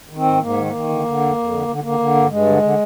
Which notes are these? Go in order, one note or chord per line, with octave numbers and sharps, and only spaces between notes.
D#3
C4
G#2
G#2 A#3
D#3
A#3
D#3
D3
D3
F2
F2
D3
D3
D3 A#3
D3
G2
G2 G#3
D3
D3